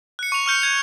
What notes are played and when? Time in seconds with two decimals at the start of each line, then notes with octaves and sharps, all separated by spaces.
0.19 F#6 C#7
0.32 C#6 F7
0.46 C#6 F6 G6 C#7
0.62 G6 G#6 F7